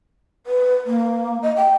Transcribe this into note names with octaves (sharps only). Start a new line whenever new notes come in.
B4
A#3
D#5
G5